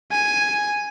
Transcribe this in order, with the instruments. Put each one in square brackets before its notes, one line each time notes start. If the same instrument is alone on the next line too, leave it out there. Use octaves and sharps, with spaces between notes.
[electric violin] G#5